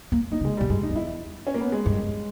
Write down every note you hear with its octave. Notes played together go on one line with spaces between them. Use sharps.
A#3
A#3 D#4
C#3
G#3
A#2 G3
G2 G#3
D#4
E2
E4
C#4
A#3
B3
G#3
G2